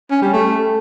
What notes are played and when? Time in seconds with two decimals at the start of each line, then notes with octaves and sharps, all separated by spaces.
0.11 C#4
0.22 G3
0.33 A3